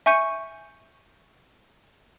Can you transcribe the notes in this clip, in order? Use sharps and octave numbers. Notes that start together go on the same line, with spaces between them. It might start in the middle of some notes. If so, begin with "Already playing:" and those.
E5 G#5 C#6 G6 C#7 D#7